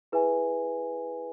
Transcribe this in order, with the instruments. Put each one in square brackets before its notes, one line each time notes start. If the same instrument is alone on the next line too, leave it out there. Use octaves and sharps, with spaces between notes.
[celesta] E4 G#4 B4 E5 G#5